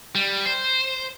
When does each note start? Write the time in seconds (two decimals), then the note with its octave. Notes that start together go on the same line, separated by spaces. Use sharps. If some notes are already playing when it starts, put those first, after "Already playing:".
0.15 G3
0.46 C5